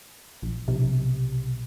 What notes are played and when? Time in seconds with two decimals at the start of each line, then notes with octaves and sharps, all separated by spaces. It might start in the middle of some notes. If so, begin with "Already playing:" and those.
0.42 A#1
0.68 B1 C3